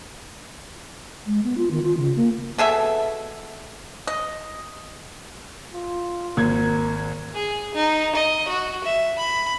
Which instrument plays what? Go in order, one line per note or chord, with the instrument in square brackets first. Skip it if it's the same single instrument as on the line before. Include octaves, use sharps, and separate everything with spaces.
[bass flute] G#3
B3
F4
D#3
F4
C#3
A#3
[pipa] B2 G#4 A4 E5
D#5
[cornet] F4
[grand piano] G#1 G#6 [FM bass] A#3 [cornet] A#4
[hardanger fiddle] G#4
D#4
D#5
F#4
E5
B5